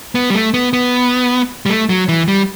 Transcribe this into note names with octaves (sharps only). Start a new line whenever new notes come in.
B3
G3
A3
B3
B3
G3
A3
F#3
E3
G3